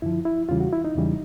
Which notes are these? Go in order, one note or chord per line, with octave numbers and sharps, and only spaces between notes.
F#2 D3 F3 E4
E4
E2 C#3 E3 G3 F4
F#4
E4
D#4
E2 C#3 E3 G3